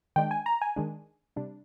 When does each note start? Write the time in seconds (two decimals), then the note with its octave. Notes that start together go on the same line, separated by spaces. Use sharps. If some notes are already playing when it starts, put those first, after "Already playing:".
0.16 D#3 G#3 D4 G5
0.31 G#5
0.46 A#5
0.62 G#5
0.76 D#3 G#3 D4
1.36 C3 G3 D4